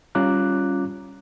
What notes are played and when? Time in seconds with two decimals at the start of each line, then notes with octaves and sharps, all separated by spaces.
0.15 G3 C#4 F4 A#5 D6 F#6